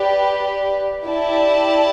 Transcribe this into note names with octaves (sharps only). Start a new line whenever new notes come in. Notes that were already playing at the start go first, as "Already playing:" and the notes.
Already playing: G4 B4 D5
E4 G4 D5 A5